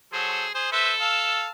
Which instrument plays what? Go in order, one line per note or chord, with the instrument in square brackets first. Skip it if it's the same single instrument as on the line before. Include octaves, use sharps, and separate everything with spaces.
[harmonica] F#3 A4 C5 [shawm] G#4
[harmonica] G#4 [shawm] C5
[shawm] A4 [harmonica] B4 C5 E5
[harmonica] F5 A5 E6